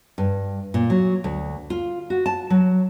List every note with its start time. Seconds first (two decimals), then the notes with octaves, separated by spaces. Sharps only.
0.18 G2
0.74 A#2
0.90 F#3
1.24 D2
1.70 F4
2.10 F#4
2.26 A5
2.50 F#3